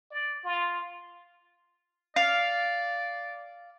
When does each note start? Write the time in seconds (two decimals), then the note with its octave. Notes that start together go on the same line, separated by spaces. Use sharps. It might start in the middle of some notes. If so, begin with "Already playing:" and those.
0.11 D5
0.45 F4
2.16 D5 F5